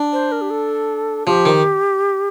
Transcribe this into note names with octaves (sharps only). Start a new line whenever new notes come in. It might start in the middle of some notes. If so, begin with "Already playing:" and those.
Already playing: D4
C5
A#4
G4
A4
F3 G4
D#3